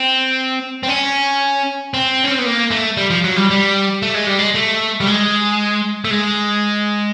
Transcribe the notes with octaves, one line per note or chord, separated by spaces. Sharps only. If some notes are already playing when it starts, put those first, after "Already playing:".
Already playing: C4
C4
C#4
C4
C#4
C4
B3
A#3
A3
G3
F3
F#3
G3
G3
A3
G#3
G3
G#3
A3
G3
G#3
A3
G#3